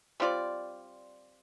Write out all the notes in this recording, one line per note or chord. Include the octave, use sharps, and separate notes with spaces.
G3 C4 F4 D5